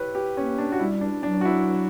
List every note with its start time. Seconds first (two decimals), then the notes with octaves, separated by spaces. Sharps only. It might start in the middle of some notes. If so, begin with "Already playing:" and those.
Already playing: E4 G4 B4 C#5
0.15 G4
0.36 A#3 C#4
0.58 D4
0.72 F#4
0.79 G3 E4
1.01 D4
1.23 F#3 D4
1.41 F#4
1.45 E4